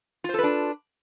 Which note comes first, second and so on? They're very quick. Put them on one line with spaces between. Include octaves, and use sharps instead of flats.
F4 C5 A4 B4 D4